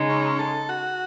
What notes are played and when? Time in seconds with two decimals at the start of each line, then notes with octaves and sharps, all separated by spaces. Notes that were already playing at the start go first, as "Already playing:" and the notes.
Already playing: C#3 G#3 D#4
0.10 C#4
0.39 A4
0.69 F#4